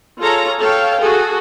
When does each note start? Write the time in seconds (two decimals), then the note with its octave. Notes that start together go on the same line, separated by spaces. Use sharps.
0.21 F4 G#4 A4 C#5 A#5
0.60 A4 C#5 F5 G5
1.01 F#4 G#4 A4